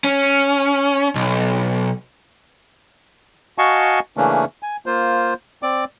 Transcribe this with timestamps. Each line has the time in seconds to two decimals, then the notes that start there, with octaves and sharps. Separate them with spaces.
0.04 C#4
1.15 B1
3.58 F#4 D#5 F5 G#5 A5 C#6
4.17 C#3 E3 A3 A#3 C#4 D4
4.63 G#5
4.86 A#3 F4 C5
5.63 C4 D5 D6